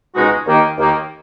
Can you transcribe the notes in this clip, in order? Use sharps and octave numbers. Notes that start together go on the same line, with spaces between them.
C#2 B2 G#3 D#4 F#4
D#2 D#3 A#3
D#2 D#3 A#3